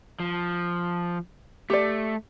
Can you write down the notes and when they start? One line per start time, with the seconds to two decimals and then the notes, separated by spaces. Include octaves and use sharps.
0.20 F3
1.70 A3 G4 D5